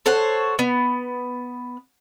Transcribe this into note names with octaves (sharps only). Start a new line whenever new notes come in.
A4 C5 C#5 F#5
B3